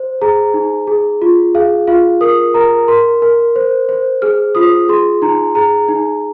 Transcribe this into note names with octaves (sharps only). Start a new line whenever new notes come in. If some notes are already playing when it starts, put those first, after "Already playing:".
Already playing: C5
G#4 A#5
D#4
G#4
F4
G#4 F5
F4 F5
A#4 D#6
A#4 A#5
A#4 C6
A#4
C5
C5
G#4 F6
F4 D#6
G#4 C6
D#4 A#5
G#4 A#5
D#4